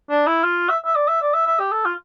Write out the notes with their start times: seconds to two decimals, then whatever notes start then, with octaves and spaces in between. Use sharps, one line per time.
0.10 D4
0.27 E4
0.44 F4
0.69 E5
0.85 E5
0.96 D5
1.08 E5
1.21 D5
1.34 E5
1.47 E5
1.59 G4
1.72 A4
1.85 F4